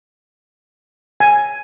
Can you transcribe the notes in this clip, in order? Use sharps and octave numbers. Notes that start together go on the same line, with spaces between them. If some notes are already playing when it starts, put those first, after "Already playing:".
G#5